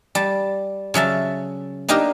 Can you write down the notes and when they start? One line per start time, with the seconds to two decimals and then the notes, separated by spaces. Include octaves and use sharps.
0.15 G3 A5
0.94 C#3 F#3 E5 A5
1.88 A#3 D4 D#4 G4 A#4 D#5